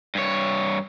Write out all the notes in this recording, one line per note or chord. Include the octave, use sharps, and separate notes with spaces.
G2 C#5